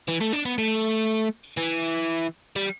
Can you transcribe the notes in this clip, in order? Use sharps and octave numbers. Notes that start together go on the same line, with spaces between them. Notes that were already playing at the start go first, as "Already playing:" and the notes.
E3
A3
D4
B3
A3
E3
G3